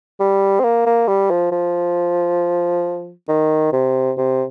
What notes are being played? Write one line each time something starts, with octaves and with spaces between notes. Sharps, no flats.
G3
C4
A#3
A#3
G3
F3
F3
D#3
C3
C3